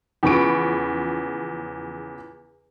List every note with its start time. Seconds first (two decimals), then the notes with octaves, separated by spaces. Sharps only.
0.23 E2 C#3 F3 B5 C#6 D7